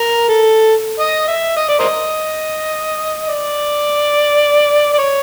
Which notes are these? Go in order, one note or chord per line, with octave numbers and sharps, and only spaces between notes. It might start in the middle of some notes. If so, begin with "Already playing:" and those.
Already playing: A#4
A4
D#5
E5
D#5
D5
A#4 C5 D#5
D5
D5
C#5